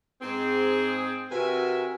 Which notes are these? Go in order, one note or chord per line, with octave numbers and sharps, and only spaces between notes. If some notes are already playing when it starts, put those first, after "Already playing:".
G#2 C4 G#4
C3 F#4 A#4 B4 E5 G#5